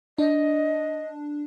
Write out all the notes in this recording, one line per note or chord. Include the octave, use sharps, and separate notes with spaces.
D4 D#5